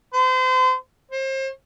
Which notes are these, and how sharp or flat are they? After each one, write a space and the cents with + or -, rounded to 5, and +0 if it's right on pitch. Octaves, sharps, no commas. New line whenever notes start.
C5 -35
C5 +35